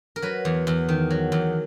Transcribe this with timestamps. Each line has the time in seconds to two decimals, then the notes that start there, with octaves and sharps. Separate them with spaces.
0.16 A#4
0.22 F#3 B4
0.45 E2
0.67 E2
0.89 D#3
1.10 F#3
1.32 E2